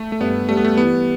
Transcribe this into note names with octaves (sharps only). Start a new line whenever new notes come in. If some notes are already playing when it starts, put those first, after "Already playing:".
Already playing: A3
A3
G2 B3
G3 A3
B3
A3
E3 B3